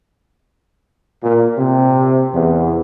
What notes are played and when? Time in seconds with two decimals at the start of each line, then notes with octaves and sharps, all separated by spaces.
1.23 A#2
1.57 C3
2.33 E2